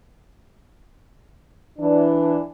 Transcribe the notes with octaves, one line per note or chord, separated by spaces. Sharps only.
E3 D4